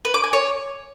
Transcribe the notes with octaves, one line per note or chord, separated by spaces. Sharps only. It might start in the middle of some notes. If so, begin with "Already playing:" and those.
B4
D6
G#5
C#5